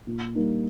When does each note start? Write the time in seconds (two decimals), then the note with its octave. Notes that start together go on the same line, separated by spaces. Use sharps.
0.07 A#2
0.35 G3 A#3 D#4